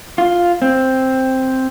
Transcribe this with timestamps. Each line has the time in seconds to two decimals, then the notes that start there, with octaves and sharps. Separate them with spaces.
0.18 F4
0.62 C4